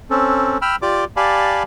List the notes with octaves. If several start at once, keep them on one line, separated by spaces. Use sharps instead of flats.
C4 C#4 A4
G5 B5 E6 F6
F4 G4 D5 D6
G4 D5 F5 G#5 A5 B5